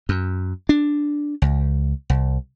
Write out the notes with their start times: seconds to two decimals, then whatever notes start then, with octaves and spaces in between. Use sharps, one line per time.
0.09 F#2
0.69 D4
1.42 C#2
2.10 C2